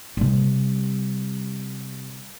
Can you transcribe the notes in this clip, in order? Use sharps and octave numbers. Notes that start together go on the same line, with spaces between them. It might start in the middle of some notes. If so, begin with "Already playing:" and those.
C3 G3